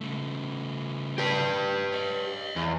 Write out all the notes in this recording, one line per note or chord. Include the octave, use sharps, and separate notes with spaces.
C#3 A3
G4 B4
C#5 D#5
E2